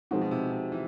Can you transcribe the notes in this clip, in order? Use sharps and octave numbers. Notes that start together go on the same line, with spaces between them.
B2 F3 G#3 C4 D#4 F#4
B2
C3
C3
E3